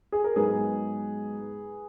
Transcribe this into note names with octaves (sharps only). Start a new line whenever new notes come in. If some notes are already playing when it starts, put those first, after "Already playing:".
G#4
A#4
G#2 F#3 B3 D#4 G#4 B4